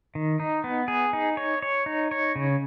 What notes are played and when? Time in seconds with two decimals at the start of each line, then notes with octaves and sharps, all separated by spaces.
0.15 D#3
0.40 D#4
0.64 B3
0.88 G#4
1.13 D#4
1.37 C#5
1.62 C#5
1.86 D#4
2.11 C#5
2.36 C#3